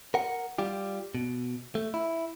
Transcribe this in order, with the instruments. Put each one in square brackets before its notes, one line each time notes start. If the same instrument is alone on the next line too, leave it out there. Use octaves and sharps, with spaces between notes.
[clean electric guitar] A#4 F#5
G3 F4 G4
B2
A3
E4